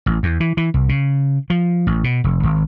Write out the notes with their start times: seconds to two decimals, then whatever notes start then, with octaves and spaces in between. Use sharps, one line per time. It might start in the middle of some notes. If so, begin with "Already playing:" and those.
0.06 A1
0.23 E2
0.40 E3
0.57 E3
0.74 C2
0.89 C#3
1.50 F3
1.87 A1
2.04 B2
2.24 F1
2.43 G#1